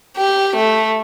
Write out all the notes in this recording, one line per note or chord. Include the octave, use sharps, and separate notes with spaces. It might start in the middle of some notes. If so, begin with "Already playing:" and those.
G4
A3